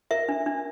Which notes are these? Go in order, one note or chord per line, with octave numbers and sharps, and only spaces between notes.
A#4 E5
D4
D4